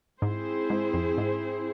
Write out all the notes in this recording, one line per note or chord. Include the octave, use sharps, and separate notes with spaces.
G#2 C4 E4 G#4 C5
G#2
F2
G#2